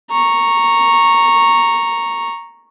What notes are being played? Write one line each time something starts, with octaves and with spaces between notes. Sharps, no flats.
A#5 C#6